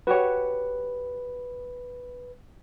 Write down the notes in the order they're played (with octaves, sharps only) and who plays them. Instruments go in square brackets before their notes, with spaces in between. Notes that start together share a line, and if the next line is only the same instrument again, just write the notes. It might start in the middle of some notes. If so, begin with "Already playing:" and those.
[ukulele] F#4 G4 C#5 [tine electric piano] B4